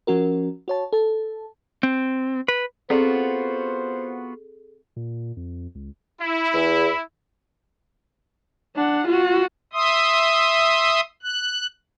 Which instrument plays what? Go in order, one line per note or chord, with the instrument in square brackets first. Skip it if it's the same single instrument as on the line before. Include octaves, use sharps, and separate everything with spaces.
[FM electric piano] F3 C#4 F#4 A#4
F#4 C#5 A5
A4 A5
[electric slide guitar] C4
B4
[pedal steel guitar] B3 F4 F#4 [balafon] C4 D5 [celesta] G#4 A4 [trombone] C5
[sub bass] A#2
F2
C#2
[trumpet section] E4
[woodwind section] E2
[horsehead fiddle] D4 F#5
F4 F#4
[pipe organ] E5 C6 D#6
F#6